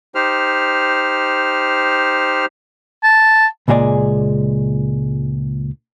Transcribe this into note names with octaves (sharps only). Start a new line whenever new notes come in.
D#4 G4 C5 F6
A5
C#2 A#2 G#3 G#4 D5